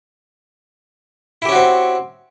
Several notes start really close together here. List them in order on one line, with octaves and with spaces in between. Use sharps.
E4 G4 C#4 F#4 C4